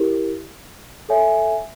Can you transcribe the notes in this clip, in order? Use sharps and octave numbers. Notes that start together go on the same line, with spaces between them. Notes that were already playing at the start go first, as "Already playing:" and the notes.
Already playing: E4 G4 A#4
A4 C#5 E5 G#5